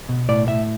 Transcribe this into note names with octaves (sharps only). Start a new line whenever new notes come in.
B2
A2 D5
A2 E5